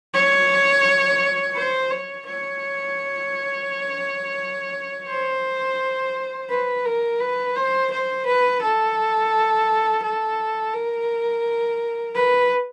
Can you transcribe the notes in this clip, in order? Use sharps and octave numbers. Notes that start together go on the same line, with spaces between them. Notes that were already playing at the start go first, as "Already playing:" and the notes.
C#5
C5
C#5
C#5
C5
B4
A#4
B4
C5
C5
B4
A4
A4
A#4
B4